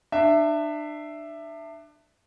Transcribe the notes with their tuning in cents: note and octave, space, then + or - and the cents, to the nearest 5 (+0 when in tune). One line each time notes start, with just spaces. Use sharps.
D4 +30 E5 +10